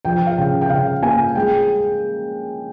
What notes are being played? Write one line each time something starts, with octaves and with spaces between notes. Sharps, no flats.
F3 G5
F5
C#3 G5
G5
C#3 F5
A#3 G#5
G#3 G5